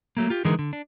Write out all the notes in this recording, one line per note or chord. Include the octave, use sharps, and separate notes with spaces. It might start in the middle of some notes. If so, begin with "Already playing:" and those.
F#3 A3 A#3
F4 G4
D3 E3 G#3 D#4 G#4 A#4
D3
D4